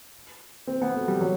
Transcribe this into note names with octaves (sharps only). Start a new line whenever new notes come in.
C4
B3
A3
G3
F#3